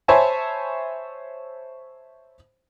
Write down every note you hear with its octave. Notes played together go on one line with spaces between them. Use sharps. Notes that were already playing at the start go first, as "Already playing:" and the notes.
C5 C#5 E5 G#5 A5 B5